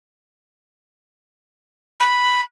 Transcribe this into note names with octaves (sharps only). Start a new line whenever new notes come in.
B5